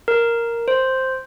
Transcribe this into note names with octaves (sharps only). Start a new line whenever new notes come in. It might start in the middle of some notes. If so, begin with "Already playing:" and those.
A#4
C5